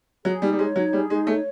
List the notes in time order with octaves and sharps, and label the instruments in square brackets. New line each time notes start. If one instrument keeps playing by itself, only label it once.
[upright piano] F#3 [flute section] G#4
[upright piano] G3 [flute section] D#4
[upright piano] G3
[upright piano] G#3 [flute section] C#5
[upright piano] F#3 [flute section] D#4
[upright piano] G3 [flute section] G#4
[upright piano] G#3 [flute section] D#4
[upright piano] A3 [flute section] C#5